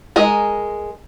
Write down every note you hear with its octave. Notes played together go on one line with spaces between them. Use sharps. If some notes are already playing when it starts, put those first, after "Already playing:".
G#3 G#4 A#4 D#5